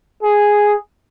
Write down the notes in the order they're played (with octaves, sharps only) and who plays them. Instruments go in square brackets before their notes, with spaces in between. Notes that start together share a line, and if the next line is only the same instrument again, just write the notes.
[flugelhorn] G#4